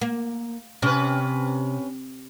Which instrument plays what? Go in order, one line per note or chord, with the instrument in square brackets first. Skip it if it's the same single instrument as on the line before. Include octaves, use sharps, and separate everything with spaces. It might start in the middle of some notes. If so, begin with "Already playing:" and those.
[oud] A#3
[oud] C3 [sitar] C#4 B4